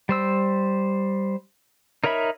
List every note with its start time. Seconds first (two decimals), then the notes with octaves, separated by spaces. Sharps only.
0.09 G3 C5 E6
2.04 D#4 A#4 C#5 E5 B5